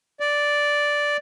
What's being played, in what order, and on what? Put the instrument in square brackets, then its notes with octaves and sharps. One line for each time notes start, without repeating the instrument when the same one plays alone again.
[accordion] D5